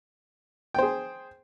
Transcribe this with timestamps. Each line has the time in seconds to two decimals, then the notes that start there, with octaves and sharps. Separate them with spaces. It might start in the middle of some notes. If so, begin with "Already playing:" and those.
0.74 G5
0.78 C5
0.82 G#4